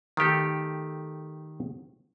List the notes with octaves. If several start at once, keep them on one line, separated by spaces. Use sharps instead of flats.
D#3 A3 G4 A4